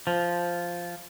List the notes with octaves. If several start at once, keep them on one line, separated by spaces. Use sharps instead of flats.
F3